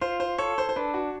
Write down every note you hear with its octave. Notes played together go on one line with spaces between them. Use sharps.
F4 C5
C5
A4 C#5
C5
C5
D4 B4
F#4